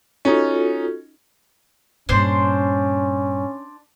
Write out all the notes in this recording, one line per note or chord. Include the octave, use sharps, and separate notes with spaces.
C#4 D#4 F4 F#4 A4
G2 A#2 C#4 D4 C5 C6